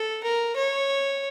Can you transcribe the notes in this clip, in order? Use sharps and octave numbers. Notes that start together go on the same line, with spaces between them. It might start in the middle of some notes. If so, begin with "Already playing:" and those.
Already playing: A4
A#4
C#5